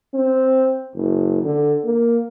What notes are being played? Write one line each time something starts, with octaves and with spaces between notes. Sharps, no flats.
C4
F#1
D3
A#3